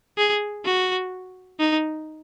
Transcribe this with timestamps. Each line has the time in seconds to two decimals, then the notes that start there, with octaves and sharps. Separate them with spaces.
0.18 G#4
0.65 F#4
1.60 D#4